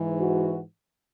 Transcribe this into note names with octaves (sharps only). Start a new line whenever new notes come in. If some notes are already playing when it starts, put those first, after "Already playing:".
Already playing: G#2 E3
F#4